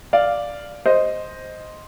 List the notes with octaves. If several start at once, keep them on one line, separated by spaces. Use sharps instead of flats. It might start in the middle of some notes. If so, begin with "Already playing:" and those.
D5 F5
C5 D#5